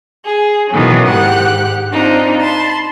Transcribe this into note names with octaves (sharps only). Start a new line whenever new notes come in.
G#4
B2 D#3 E3 F#3 C#4
G#2 G4 F#5 F#6
C4 D4 D#4 F4
A5 B5 C6